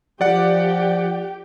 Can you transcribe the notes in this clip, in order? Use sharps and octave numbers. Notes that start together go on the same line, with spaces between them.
F3 G4 D5 F#5 G5